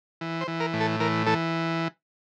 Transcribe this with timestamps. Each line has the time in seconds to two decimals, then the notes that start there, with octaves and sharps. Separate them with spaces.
0.21 E3
0.41 C5
0.48 E3
0.60 A#4
0.73 A2
0.81 A4
1.00 E3 A#4
1.27 E3 A4